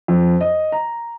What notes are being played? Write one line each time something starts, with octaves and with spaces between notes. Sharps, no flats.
F2
D#5
A#5